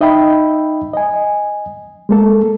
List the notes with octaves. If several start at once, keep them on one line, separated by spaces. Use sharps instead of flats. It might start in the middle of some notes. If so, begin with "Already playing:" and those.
D#4 D#5 E5 G5 B5
D#5 G#5
G#3 A#3 A4